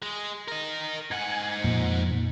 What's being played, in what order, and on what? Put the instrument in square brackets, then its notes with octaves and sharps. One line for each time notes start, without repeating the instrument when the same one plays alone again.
[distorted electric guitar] G#3
A#4 D#5
[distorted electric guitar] G#2 F#5 [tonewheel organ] G#5
[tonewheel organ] F2 A#2